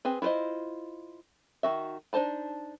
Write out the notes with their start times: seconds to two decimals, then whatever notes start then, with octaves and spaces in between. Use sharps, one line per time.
0.05 C4 G#4 B4
0.22 E4 F4 B4 C5 D#5
1.63 D#3 F#4 E5
2.13 D4 D#4 C5 A5 B5